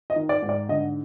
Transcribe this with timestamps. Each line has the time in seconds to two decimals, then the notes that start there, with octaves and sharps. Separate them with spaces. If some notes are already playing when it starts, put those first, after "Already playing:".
0.10 D#5
0.16 D#3
0.29 D5
0.42 G#2
0.49 D5
0.69 D3 D#5